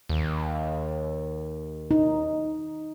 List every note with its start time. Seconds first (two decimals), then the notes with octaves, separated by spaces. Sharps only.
0.09 D#2
1.91 D#4